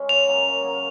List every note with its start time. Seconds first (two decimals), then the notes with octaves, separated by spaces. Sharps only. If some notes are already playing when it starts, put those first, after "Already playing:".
Already playing: G#3 C#4
0.09 C#3 F7
0.27 F#3 A#3
0.46 C#3
0.63 F#3 A#3